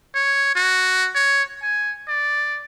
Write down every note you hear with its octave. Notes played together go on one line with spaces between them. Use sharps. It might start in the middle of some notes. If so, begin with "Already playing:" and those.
C#5
F#4
C#5
G#5
D5